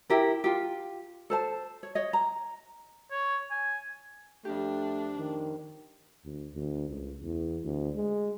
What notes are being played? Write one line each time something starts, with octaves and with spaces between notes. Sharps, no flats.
E4 G4 A#4
F4 G4
A4 C5 A5
C#5
C#5 D#5
A#5
C#5
G#5
F2 A3 D4 G4
D#3
D2
D2
C#2
E2
D2
G#3